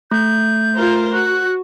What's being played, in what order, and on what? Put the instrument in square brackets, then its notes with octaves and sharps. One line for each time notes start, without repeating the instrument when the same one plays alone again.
[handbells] A3 [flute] G6
[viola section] F4 A#4 C5
[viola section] F#4 [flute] F#6